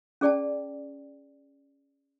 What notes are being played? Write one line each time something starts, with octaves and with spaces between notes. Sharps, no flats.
C#4 G#4 D5 G5 A5